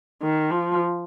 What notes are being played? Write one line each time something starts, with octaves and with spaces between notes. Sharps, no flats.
D#3
F3